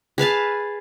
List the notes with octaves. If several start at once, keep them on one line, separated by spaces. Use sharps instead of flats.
G#4 B4 F5 A5